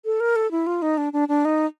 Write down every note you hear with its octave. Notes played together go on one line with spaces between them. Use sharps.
A4
A#4
A4
E4
F4
D#4
D4
D4
D4
D#4